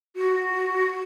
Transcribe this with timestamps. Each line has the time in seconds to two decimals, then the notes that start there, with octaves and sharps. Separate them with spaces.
0.16 F#4